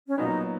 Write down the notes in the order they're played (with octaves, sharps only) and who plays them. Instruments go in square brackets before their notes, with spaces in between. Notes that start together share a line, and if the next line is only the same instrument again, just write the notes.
[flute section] C#4
[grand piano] A#2 F#3 B3 [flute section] D#4